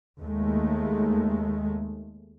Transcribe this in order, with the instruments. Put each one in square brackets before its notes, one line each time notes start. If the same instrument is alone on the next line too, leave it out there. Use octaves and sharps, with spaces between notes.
[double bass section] D#2 G#3 A3